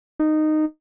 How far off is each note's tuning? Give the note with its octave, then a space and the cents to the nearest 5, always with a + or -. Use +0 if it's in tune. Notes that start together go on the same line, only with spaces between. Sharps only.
D#4 -15